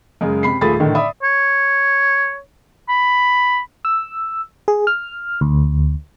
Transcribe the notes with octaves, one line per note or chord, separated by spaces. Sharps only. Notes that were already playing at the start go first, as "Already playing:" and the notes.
F#2 C#3 G#3
C3 B5 C7
D#1 A3 F4 G#4 B5 A6
A2 D3 D#3
D5 E5 B5 D#6
C#5
B5
E6
G#4
F6
D2